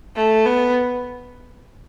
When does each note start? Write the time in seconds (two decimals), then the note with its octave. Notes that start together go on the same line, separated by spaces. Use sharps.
0.15 A3
0.45 B3